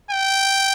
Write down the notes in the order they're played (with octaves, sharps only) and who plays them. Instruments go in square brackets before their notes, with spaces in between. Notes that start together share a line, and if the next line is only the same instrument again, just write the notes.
[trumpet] G5